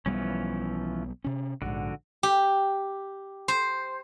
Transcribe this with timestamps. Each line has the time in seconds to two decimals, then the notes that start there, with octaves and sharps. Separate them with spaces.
0.06 B1 E3 F3 G3 B3 C#4
1.24 C3 C#4
1.62 A#1 G#2 D3 F#4
2.23 G4
3.48 C5